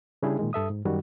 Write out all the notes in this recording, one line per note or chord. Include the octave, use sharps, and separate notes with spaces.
C#3 G3 D4 E4 G4 G#4
A#2 D#3 G#3
G2 A4 E5 D#6
G#2
F#2 D#3 G3 F#4